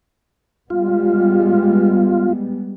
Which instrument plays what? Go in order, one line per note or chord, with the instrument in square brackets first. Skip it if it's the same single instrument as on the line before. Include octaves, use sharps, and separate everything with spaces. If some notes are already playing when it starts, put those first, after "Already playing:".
[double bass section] G3 G#3 B3 [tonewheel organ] F4